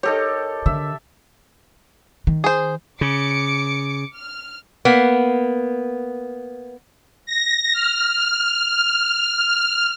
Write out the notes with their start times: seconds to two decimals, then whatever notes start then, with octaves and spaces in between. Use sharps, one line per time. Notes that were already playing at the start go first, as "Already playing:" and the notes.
0.03 D#4 G4 A4 A#4 C#5
0.66 D3 E5
2.27 D#3
2.44 G#4 C5
3.01 C#3 D6 C#7
4.18 F6
4.85 A#3 B3
7.26 A#6
7.73 F6